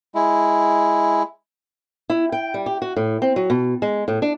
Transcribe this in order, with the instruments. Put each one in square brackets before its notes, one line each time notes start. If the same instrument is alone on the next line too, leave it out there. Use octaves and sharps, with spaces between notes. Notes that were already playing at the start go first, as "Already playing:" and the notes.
[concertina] G#3 E4
[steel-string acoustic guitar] E4
G5
G3
G4
F#4
A2
C4
F#3
B2
G#3
A2
D4